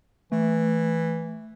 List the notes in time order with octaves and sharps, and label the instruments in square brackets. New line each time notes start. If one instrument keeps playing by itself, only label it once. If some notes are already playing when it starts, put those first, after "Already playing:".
[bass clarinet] E3 [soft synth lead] A3